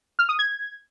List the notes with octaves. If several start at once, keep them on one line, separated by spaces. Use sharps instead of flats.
F6
D#6
G#6